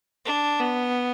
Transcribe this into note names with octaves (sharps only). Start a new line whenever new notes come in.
D4
B3